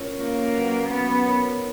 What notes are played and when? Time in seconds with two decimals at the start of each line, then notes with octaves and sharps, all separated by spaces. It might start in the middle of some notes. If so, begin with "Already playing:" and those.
Already playing: C#4 F4 A#4 C#5
0.20 A#3 C#4 F4 A#4 C#5
0.55 F#3 C#4 F#4 B4
0.90 F#3 B3 C#4 F#4 B4
1.25 D#4 A#4 C#5